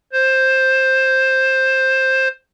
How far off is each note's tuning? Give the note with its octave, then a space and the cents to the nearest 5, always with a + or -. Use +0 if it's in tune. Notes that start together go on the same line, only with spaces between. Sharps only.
C5 +10